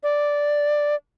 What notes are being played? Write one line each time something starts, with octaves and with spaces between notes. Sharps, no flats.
D5